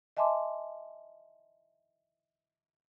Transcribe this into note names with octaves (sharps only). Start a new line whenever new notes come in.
D#5 E5 G#5 A5 C6 D6